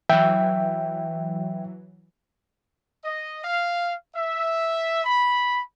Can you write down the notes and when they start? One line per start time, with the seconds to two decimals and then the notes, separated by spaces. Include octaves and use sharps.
0.09 E3 F#3 E5 G5
3.05 D#5
3.44 F5
4.15 E5
5.05 B5